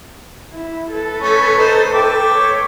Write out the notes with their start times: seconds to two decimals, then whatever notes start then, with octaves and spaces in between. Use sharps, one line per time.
0.52 E4
0.92 A4 B4
1.22 A3 C#4 C#5
1.59 D#4 C5
1.93 E5 G5 D6
2.33 C#5